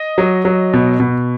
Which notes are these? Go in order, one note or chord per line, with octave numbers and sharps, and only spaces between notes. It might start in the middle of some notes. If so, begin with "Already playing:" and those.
Already playing: D#5
F#3
F#3
B2
B2